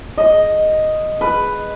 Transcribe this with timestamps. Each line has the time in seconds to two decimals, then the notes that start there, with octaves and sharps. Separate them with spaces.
0.17 D#5
1.21 B4